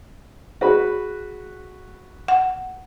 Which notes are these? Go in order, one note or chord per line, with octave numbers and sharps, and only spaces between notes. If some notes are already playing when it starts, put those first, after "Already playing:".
F#4 G#4 B4 B5
F#5